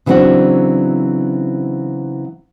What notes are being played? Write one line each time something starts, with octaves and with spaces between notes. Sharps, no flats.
C#3 E3 F#3 C4 D4 F#4